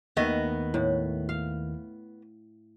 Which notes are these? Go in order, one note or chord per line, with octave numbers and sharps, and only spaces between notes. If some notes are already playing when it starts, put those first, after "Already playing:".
D#2 D#3 A3 B3 D#5
A2
F5